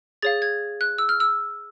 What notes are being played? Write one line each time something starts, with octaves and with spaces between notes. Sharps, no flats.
G#4 C#5 F5 A6
G#6
F#6
E6
F6
E6